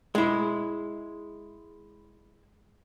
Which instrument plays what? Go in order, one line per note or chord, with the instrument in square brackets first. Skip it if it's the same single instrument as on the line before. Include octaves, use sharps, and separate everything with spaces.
[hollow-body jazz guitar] G#3 E4